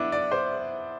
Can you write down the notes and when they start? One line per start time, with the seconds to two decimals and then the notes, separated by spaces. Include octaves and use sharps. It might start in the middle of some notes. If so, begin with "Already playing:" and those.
Already playing: B3 D4 E4
0.12 D5
0.32 C5